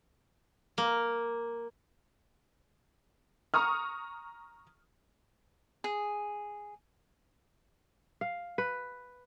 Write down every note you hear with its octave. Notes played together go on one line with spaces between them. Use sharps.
A#3
A#5 C#6 D#6 F6
G#4
F5
B4